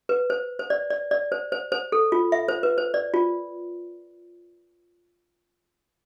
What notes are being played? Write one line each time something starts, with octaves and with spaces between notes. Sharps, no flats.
B4
C5
C5
D5
D5
D5
C5
C5
C5
A4
F4
E5
C5
B4
C5
D5
F4